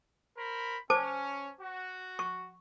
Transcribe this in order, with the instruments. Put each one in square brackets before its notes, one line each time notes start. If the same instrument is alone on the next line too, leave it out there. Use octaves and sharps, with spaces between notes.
[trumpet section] A#4 C5 B5
[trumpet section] C#4 [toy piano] C5 A5 D6
[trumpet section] F#4
[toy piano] C#6